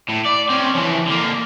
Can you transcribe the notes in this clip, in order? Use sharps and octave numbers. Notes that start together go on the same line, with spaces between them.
A2
D5
C4 C#4
E3 F3
D3 A#3